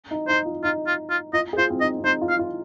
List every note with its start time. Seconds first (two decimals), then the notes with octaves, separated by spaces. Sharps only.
0.11 D#4
0.28 D#4 C5
0.46 F4
0.63 D#4 F4
0.87 F4
1.10 F4
1.33 F4 D#5
1.53 G#4
1.58 F4 C5
1.70 C4
1.80 D#4 D#5
1.98 C4
2.04 D#4 C5
2.22 F4
2.28 F5
2.39 F4